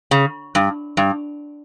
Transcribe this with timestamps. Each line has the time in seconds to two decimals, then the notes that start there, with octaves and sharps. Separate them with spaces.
0.11 C#3
0.55 G2
0.97 G2